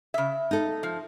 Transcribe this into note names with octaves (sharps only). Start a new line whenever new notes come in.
C#3 E5
D#4 A4
F3